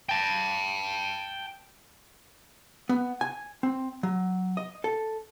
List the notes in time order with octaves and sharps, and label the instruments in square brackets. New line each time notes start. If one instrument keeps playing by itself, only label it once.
[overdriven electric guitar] G5 A5
[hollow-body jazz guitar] B3
G#5
C4
F#3
D#5
A4